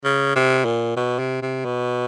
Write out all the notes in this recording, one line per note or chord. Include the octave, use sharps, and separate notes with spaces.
C#3
C3
A#2
B2
C3
C3
B2